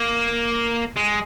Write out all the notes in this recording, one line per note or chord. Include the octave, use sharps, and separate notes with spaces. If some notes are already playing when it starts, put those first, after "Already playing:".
Already playing: A#3
G#3